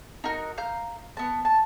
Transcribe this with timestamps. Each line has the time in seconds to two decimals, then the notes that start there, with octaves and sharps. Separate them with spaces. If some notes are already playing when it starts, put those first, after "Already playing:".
0.24 D#4 F#4 A#4
0.58 F5 A#5 G6
1.17 B3 A5
1.45 A5